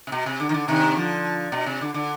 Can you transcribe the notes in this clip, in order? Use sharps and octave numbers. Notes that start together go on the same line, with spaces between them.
C3
B2
C3
D3
D#3
D3
C3 D#3
D3 F3
B2
C3
D3
D3